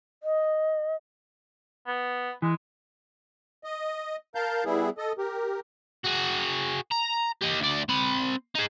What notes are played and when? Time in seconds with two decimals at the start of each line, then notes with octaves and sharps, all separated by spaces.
0.23 D#5
1.87 B3
2.42 E3 G#3
3.64 D#5
4.35 A#4 F5 A5 G6
4.65 G3 B3 E4 G#4
4.98 A4 D#5
5.18 G4 A#4
6.05 F#4 G#4
6.92 A#5
7.41 G4 D#5
7.60 D2 D5
7.89 C4 B5
8.55 D#4 G#4